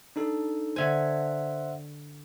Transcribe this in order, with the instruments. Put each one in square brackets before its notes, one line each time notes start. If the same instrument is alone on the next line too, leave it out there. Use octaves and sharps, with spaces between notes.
[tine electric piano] D4 D#4 A4
[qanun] D3 G#5 [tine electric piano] C5 E5 F#5